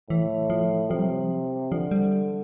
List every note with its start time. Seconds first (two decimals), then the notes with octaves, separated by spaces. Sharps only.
0.09 A2 E3
0.50 F3
0.91 C3 F3
0.99 G3
1.07 F3
1.71 D3 F3
1.91 G3